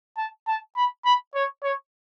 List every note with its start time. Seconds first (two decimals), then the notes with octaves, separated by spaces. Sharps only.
0.17 A5
0.48 A5
0.77 B5
1.05 B5
1.35 C#5
1.64 C#5